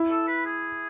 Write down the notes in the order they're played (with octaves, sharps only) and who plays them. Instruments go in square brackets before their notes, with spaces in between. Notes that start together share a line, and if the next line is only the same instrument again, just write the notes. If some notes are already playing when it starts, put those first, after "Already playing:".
Already playing: [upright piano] E4
[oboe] A4
B4
G#4